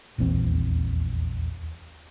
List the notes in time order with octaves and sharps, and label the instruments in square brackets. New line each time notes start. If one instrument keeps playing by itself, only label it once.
[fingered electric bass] D#1 A#1 E2 C4